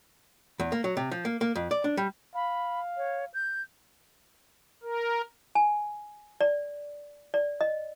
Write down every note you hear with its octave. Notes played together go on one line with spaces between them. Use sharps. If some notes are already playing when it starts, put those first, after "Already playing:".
E2
A#3
F#3
C3
F3
A#3
A#3
F2
D5
D4
G3
F5 B5
C#5
G6
A#4
G#5
D5
D5
D#5